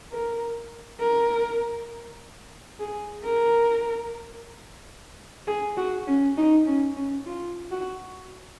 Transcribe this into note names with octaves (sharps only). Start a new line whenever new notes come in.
A#4
A#4
G#4
A#4
G#4
F#4
C#4
D#4
C#4
C#4
F4
F#4